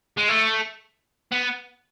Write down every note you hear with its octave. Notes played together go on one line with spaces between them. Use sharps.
G#3
A3
B3